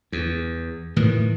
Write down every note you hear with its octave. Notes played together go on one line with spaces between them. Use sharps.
E2
A2 D#3 E3